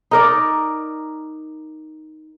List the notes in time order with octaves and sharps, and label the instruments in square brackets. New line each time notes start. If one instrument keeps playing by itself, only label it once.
[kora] D#4 A#4 D5